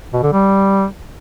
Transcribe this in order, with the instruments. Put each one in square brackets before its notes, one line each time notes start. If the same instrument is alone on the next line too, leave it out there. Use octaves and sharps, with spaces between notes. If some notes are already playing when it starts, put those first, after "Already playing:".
[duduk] B2
D3
G3